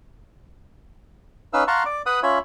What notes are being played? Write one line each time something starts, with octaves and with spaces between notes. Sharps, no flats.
C#4 D#4 B4 F5 E6
F5 F#5 A5 A#5 C6 C#6
D5 D6
B4 F#5 B5 D#6
C#4 F4 C#5 E5 B5